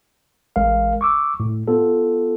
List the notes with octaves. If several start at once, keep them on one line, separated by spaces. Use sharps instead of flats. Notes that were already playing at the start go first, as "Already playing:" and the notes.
A1 G#3 A#4 F5
C#6 D6 E6
A2
B3 F4 A4